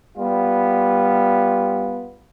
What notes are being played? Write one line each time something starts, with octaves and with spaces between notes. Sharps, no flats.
G3 B3 F4